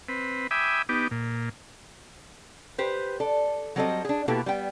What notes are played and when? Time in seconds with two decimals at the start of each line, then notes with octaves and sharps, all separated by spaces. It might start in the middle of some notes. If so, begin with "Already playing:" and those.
0.09 C4 B4
0.51 E5 G5 G#5 B5 D6 D#6
0.89 B3 D#4 G4 D6
1.11 A#2
2.78 G4 B4 C5
3.20 A4 D5
3.76 F#3 G3 C4 A4 D5 D#5
4.05 D4 G#4
4.28 B2 A#3 E4 G4 A4 B4
4.46 G3 B3 G5